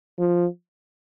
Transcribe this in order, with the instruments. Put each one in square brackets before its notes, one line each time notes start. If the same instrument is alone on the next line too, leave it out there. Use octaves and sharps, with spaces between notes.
[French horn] F3